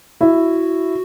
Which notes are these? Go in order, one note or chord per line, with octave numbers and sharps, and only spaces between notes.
E4 F#4